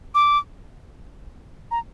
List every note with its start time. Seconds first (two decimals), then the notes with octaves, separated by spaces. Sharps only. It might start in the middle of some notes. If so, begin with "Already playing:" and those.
0.15 D6
1.71 A#5